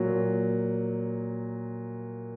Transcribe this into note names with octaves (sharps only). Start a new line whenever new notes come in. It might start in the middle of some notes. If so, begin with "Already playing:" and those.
Already playing: A#2 F#3